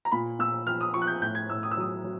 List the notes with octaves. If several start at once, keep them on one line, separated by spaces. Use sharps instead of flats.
A#5
A#2 B5
A#2 E6
F3 F6
D#6
F3 C#6
F#6
G6
A2 G6
G#6
A2 E6
D#6
E6
F#3 D#6
F#3